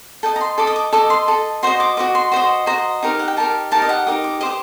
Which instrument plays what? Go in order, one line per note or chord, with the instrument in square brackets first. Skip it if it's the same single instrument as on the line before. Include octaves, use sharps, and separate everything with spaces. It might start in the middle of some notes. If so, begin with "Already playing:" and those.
[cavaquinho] A4 D#5 G5
A#5
C6
A4 D#5 D6
D#6
D6
A4 D#5 D6
C6
A4 D#5
F#4 C5 D#5 C6
D6
F#4 C5 D#5 D6
C6
F#4 C5 D#5 C6
F#4 C5 D#5 A#5
D#4 G4 A#4
F#5
G5
D#4 G4 A#4 A5
D#4 G4 A#4 A5
D#5
F#5
D#4 G4 A#4 D#6
D6
G4 C5 D#5 D6